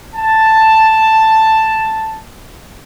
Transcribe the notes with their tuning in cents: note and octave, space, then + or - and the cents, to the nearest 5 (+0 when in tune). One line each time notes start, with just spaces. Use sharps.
A5 +5